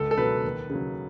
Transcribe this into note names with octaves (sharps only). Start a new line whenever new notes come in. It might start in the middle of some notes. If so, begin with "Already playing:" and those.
Already playing: C#2 A4
A4
B2 F#3 B4
D#2
C#3
F#3